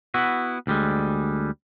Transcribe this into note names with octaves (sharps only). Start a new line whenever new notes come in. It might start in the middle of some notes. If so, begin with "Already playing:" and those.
B3 E4 F#4
D2 G3 G#3